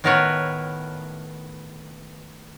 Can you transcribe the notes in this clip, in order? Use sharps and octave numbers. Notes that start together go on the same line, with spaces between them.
A2 D#3 B3 A#4 B4 C#5